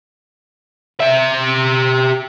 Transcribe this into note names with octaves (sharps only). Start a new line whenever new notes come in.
G4 E5